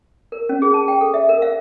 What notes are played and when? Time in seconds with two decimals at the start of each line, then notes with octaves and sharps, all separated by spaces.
0.32 A#4
0.49 C#4
0.62 G#4
0.74 A5
0.88 G5
1.01 A4
1.14 E5
1.29 A#4
1.42 F5